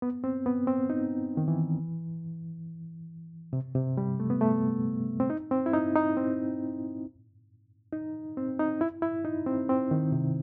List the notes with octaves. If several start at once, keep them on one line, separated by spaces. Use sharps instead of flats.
B3
C4
B3
C4
D#4
D#3
E3
C3
C3
G3
A3
B3
A3
C4
D#4
C4
E4
D#4
D#4
C4
D#4
C4
D#4
E4
E4
D#4
C4
C4
D#3
C3